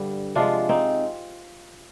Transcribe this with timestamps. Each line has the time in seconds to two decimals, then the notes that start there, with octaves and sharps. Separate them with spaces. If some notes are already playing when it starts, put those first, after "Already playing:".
Already playing: G2 D3 G3
0.35 C3 F3 G#3 D4 F4
0.69 C4 D#4